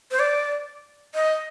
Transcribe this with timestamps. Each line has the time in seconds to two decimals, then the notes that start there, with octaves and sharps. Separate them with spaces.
0.11 C5
0.19 D5
1.15 D#5